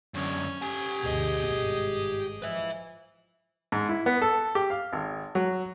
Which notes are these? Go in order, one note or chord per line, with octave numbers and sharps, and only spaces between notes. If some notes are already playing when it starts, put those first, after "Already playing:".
F#2 D3 C#4
G4 G#5
D2 G2 B2 G#4 D#5
G#1 G2
F3 B4 E5
G#2
E4
B3
A4
G4
F5
G#1
F#3